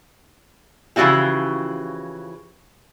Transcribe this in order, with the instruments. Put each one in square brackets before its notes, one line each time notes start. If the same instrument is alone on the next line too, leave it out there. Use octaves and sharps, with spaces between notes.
[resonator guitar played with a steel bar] C#3 E3 F3 E4 F#4 G4